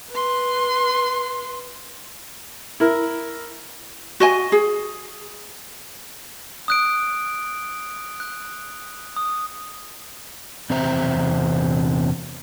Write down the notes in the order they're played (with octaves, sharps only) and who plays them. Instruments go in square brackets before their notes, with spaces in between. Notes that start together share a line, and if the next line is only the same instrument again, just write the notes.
[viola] B4 C6
[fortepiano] E4 A#4
[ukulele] F#4 D#5 G#5
G#4
[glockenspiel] D#6 F#6 D7
F#6
D#6
[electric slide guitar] E2 C3 C4 C5 E5 A#5